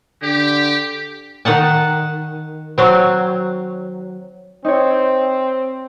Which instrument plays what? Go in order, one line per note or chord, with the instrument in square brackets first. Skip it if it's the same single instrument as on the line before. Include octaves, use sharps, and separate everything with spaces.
[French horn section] D3 [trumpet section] G4
[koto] D#3 D#4 F#5 A5
F#3 C4
[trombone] C4 [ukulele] D#4 C#5